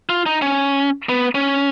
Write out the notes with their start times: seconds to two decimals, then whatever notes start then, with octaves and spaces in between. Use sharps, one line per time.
0.09 F4
0.26 D#4
0.42 C#4
1.09 B3
1.35 C#4